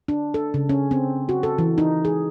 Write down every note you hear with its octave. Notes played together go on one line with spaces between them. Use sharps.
D4
A4
C#3
C#4
C4
F#4
A4
E3
D#4
G#4